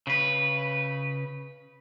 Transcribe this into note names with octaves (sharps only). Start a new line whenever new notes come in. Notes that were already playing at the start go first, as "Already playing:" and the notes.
C#3 B4